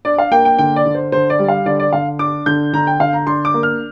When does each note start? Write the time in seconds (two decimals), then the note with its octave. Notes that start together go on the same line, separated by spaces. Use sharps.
0.05 D4 D5
0.18 F5
0.32 A#3 G5
0.45 G5
0.59 D3 G5
0.76 D5
0.86 D3
0.95 C5
1.12 D3 C5
1.30 D5
1.39 G3
1.48 F5
1.66 D3 D5
1.80 D5
1.93 D3 F5
2.19 D4 D6
2.46 D3 G6
2.73 D3 A#5
2.87 G5
3.00 D3 F5
3.13 A#5
3.27 D4 C6
3.45 D6
3.54 A#3
3.63 F6